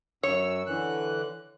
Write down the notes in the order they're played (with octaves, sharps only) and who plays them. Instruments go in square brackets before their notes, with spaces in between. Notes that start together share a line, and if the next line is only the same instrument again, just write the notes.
[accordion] F#2 E6 [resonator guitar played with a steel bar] C#5
[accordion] D3 E3 F#6